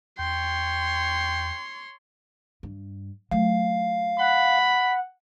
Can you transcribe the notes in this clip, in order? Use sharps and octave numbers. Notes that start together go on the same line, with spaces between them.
E2 C#5 G5 C6
G2
F#3 A3 F5
F#5 B5